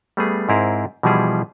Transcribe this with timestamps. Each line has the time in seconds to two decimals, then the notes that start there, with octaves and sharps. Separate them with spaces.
0.17 G3 A3 B3 G#4
0.49 G#2 C4 E4 G#4 A#4
1.03 B2 E3 F3 G3 E4 G#4